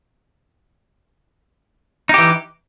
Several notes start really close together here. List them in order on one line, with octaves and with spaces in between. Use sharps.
D#4 G4 E3